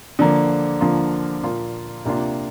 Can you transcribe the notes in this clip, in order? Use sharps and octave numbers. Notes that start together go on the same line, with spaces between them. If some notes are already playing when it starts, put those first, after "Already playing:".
D3 F3 A#3
D3 F3 A#3 F4
A#2 A#3 F4
C3 A#3 D4 F4